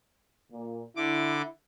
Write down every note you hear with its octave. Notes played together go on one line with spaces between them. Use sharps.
A#2
D3 E4 D6